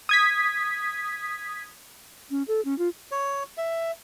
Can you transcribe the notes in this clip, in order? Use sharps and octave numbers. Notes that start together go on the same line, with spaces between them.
D#6 G#6 B6
C#4
A4
C#4
F4
C#5
E5